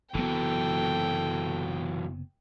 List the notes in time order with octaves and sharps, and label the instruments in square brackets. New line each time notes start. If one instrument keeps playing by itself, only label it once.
[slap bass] F#1 C3 B3 [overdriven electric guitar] E3 F#3 [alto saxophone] A4 [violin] G5